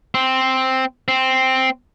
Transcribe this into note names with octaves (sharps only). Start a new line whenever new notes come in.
C4
C4